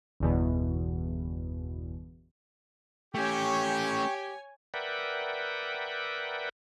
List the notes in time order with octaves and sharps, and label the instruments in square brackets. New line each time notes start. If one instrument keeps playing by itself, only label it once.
[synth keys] G1 E2 B2
[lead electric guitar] A3 C#4 [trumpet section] G4 [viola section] C#5 G#5 [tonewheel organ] G5 C#6
[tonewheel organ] A#4 B4 D5 E5 F#5 G5